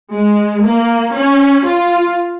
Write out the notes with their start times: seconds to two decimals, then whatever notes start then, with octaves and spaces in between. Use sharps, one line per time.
0.13 G#3
0.64 A#3
1.15 C#4
1.65 F4